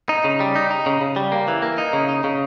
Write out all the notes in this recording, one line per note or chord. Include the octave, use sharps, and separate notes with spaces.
D#4
C#3
G3
D#4
D#4
C#3
C#3
G3
A#3
E3
A#3
D#4
C#3
D#4
C#3